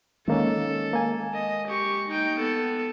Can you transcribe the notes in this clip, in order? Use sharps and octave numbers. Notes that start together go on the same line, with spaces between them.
D#3 G#3 A#3 C#4 A4
A#3 G#5
D#5
G4 C#6
D#4 G5
B3 A4